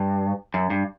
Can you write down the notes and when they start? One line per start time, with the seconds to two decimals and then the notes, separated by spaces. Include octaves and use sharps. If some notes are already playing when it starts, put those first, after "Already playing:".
Already playing: G2
0.54 F#2
0.70 G2